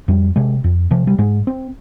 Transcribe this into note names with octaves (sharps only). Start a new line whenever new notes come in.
F2 G3
C3 G#3
F2
C3 F3
G3
G#2 G#3
C4